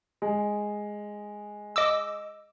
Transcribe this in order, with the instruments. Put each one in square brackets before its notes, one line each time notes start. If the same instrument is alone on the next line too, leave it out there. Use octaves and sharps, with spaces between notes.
[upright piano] G#3
[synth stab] D#5 D6 E6